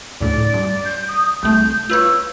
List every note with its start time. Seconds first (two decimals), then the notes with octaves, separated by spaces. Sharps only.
0.21 D2 A2 D5
0.54 G2
0.85 G6
1.08 D#6
1.43 C2 A3 G6
1.90 F4 B4 C#5 E6